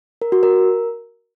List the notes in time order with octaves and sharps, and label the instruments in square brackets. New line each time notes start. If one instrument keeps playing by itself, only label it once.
[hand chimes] A#4
F#4
A#4